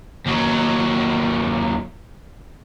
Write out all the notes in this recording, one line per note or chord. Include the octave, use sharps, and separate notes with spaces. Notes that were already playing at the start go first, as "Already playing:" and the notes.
D#2 F#3